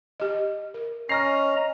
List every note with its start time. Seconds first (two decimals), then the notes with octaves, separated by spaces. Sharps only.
0.20 G4 D#5
0.74 A#4
1.09 C#4 D#5 A#5 F6 A#6 C7